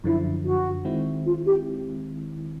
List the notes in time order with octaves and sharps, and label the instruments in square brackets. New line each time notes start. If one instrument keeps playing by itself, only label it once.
[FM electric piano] F#2 D3 F3 [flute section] E4
[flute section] F#4
[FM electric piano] D#3 G#3 C4 E4
[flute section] F4
G4